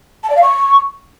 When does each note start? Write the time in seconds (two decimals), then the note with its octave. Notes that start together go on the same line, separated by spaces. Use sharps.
0.23 A5
0.30 D5
0.36 F5
0.43 C#6